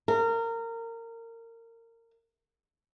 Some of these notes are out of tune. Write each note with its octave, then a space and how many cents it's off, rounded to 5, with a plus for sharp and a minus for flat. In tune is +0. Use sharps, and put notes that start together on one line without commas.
A#4 -25